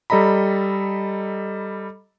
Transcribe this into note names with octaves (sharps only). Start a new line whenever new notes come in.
G3 A4 D#5 A#5 B5